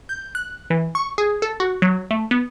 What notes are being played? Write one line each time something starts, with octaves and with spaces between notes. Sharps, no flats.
G6
F#6
E3
C#6
G#4
A4
F#4
F#3
A3
B3